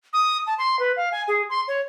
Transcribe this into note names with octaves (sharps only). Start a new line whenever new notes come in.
D#6
A5
C6
B4
F5
G#5
G#4
C6
C#5